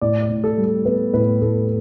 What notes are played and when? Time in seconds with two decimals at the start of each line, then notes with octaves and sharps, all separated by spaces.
0.01 A2 D5
0.23 D5
0.30 A2
0.44 A4
0.57 G3
0.64 A4
0.85 B3 B4
1.14 A2 B4
1.42 A2 A4